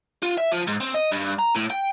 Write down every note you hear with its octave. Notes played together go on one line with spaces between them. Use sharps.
F4
E5
F3
G#2
C4
D#5
G2
A#5
A2
G5